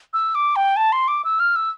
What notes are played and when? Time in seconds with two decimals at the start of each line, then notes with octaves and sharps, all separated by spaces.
0.14 E6
0.35 D6
0.56 G5
0.77 A5
0.92 C6
1.08 D6
1.25 E6
1.40 F6
1.56 E6